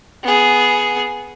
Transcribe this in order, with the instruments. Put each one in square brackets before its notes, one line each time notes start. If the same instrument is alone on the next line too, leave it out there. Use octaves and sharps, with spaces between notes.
[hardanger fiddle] B3 G#4